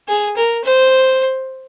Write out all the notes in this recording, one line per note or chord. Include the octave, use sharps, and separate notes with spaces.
G#4
A#4
C5